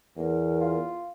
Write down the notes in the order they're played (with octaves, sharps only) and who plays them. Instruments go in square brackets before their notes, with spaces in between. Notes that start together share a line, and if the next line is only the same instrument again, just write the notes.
[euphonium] E2 [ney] A#4
[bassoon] F4